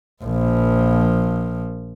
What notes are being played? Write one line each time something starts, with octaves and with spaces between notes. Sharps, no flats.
A#1 F3